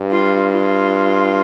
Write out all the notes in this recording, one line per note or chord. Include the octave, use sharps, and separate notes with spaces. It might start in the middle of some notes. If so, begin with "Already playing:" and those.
Already playing: G2
F4
F4